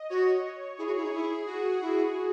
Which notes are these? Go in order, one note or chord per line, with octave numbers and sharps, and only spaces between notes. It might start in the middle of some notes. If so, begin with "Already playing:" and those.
Already playing: D#5
F#4 C#5
E4 G#4
F#4
E4
D#4
E4
F#4
E4